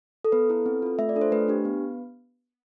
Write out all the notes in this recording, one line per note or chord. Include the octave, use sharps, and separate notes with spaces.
A4
B3 B4
E4 A4
C4
F4 A4
A3 E5
D5
D4 F4 A4
C5
A3 B4
D4 G4
B3